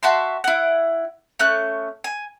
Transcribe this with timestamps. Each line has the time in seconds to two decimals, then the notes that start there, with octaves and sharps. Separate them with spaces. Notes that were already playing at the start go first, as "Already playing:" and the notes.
0.03 F#4 E5 A5 C6
0.44 E4 F#5
1.39 A3 C#4 F#6
2.04 G#5